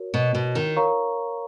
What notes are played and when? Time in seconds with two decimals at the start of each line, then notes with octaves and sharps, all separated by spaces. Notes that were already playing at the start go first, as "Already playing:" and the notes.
Already playing: F#4 A#4 C#5
0.14 B2
0.35 B2
0.55 D#3
0.77 A#4 C#5 F5 A#5 C#6